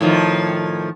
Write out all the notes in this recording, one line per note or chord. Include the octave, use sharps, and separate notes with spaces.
A2 D#3 F3